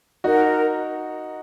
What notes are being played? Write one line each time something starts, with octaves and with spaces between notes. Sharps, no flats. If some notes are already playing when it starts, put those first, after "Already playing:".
D#4 F#4 A#4 D#5 F#5